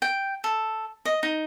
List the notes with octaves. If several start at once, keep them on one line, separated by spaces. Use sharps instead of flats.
G5
A4
D#5
D#4